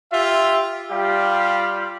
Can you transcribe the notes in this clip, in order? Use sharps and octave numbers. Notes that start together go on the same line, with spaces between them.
F4 G4 E5
G3 F4 G4 F5